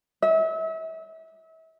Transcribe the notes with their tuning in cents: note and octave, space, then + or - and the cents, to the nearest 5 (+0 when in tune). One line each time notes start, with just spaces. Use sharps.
E5 -35